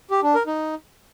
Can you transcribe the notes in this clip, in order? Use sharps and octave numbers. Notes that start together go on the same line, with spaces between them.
G4
D4
A#4
D#4